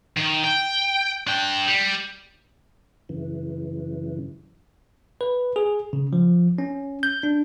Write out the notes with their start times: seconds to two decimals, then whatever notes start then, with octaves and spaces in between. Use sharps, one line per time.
0.17 D#3
0.44 G5
1.27 D4 G5
1.68 G3
3.09 F#2 C#3 E3
5.21 B4
5.56 G#4
5.93 C#3
6.13 F3
6.58 C#4
7.03 G6
7.23 D4